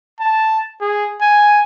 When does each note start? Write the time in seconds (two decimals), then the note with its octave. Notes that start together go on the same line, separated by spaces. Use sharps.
0.20 A5
0.81 G#4
1.21 G#5